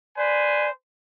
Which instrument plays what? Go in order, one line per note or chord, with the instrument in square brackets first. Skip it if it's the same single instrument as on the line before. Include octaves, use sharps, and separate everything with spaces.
[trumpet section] B4 C5 G#5 [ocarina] D5